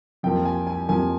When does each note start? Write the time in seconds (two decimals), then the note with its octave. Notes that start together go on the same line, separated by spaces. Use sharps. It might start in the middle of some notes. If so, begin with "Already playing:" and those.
0.23 F2 C3 F3 A#3 G5
0.45 G#5
0.67 G#5
0.89 F2 C3 F3 A#3 G#5